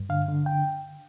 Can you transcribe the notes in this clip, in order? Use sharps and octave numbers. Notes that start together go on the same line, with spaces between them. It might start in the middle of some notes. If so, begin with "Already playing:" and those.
Already playing: G2
D3 F5
D3
G5